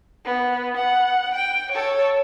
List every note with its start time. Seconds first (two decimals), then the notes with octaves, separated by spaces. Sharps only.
0.25 B3
0.77 F#5
1.35 G5
1.72 A4 C#5